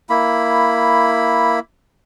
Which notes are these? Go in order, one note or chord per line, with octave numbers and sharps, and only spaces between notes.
A#3 E4 B5